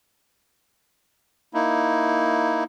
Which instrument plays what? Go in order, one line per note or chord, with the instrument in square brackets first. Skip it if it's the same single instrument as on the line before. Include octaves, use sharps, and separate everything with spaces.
[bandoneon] A#3 D#4 E4